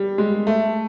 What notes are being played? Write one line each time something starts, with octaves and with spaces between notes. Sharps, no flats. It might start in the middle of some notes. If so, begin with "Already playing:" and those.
Already playing: G3
G#3
A3